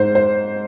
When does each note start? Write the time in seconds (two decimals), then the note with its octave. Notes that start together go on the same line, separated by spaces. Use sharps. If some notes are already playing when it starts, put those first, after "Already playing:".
Already playing: G#2 C5
0.15 C5